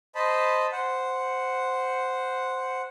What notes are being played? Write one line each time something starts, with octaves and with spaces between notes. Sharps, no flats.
C5 D#5 A5 B5
C5 F#5